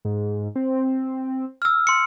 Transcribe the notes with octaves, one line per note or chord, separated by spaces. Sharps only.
G#2
C4
E6 F6
C6 C#7